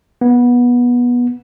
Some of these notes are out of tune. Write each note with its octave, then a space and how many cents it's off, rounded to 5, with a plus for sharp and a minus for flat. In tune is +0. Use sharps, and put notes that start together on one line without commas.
B3 -20